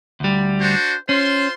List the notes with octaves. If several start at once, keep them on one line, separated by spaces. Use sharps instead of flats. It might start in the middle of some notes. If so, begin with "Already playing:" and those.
D2 G3
D4 F#4 C5
C#4 F4 C5 C6